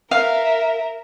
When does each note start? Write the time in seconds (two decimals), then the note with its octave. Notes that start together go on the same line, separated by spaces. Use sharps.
0.11 A#4 E5 F5